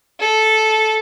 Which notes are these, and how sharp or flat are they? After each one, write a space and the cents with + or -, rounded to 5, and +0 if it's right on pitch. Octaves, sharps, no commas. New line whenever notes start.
A4 -10